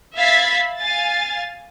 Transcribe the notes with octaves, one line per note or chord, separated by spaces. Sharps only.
E5 F5 B5 G#6 A6 B6
F5 G#5 A6